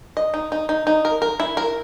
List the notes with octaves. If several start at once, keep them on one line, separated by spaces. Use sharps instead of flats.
D#5
D#4
D#4
D#4
D#4
A#4
A#4
E4
A#4